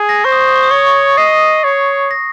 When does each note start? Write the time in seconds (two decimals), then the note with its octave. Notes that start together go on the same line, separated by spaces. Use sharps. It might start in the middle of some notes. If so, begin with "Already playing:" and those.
Already playing: G#4
0.09 A#6
0.24 C5 C#6
0.32 D#6
0.40 C#6
0.48 D#6
0.56 C#6
0.63 D#6
0.71 C#5 C#6
0.78 D#6
0.87 C#6
1.17 D#5 C7
1.64 C#5
2.11 A#6